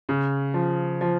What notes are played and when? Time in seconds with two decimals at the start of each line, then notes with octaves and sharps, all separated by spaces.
0.09 C#3
0.54 F3
1.01 F3